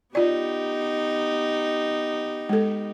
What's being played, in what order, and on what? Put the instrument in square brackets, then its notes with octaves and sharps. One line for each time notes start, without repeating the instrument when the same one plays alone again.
[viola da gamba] B3 D#4 G4 [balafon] F4 D5
[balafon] G#3 A4